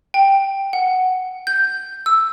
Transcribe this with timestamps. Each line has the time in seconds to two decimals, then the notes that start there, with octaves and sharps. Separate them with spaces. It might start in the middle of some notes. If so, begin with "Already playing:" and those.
0.14 G5
0.73 F#5
1.47 G6
2.06 E6